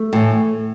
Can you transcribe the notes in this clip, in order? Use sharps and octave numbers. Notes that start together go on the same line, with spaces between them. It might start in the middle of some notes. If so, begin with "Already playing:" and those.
Already playing: A3
A2 E3